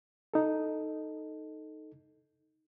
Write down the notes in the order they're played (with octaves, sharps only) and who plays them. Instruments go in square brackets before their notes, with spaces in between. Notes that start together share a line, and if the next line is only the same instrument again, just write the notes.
[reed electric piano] D#4 A4